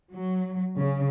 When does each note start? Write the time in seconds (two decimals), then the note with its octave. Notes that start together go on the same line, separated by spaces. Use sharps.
0.13 F#3
0.77 C#3